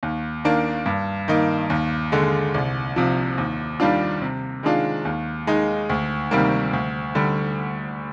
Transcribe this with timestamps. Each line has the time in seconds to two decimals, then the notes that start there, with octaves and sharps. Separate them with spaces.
0.03 D#2
0.44 D#3 A#3 D4
0.86 G2
1.28 D#3 A#3 D#4
1.70 D#2
2.12 D3 G#3
2.54 C2
2.96 C3 F3
3.38 D#2
3.80 D#3 G3 D4 F4
4.22 C3
4.63 D#3 G#3 D4 F4
5.05 D#2
5.47 D#3 G#3 D#4
5.89 D2
6.31 C3 D#3 G3 A#3
6.73 D2
7.15 D3 G3